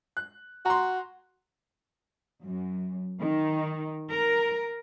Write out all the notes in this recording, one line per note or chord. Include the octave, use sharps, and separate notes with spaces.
F#6
F#4 A#5 C6
F#2
D#3
A#4